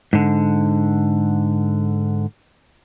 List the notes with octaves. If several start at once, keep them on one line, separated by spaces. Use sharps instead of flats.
G#2 D3